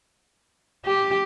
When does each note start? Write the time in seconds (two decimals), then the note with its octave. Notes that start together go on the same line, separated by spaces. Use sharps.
0.85 G4